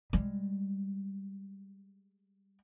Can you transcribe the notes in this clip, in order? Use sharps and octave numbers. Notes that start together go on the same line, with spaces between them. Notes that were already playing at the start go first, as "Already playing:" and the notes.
G3 G#3